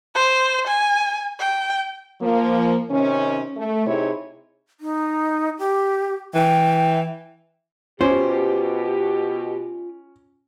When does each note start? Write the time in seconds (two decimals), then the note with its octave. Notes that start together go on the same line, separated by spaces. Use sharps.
0.15 C5
0.68 G#5
1.39 G5
2.21 F3 A#3
2.90 C3 D#3 C#4
3.57 A3
3.86 C3 D#4 E4 G#4 C#5
4.80 D#4
5.59 G4
6.34 E3 G5
8.01 B2 C#4 F4 G4 C5 D6